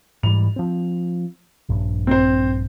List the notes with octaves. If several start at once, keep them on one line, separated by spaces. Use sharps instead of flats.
G#2 E3 G3 F7
F3 C4
A#1 G2
C4 C5